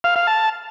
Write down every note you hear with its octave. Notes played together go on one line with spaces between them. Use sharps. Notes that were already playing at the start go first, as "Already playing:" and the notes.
F5
F5
A5